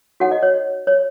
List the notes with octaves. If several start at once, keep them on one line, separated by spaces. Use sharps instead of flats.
D#4 F#4 A4 C#5 F#5
D#5
C#5
C#5